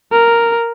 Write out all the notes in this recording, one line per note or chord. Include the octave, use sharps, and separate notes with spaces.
A#4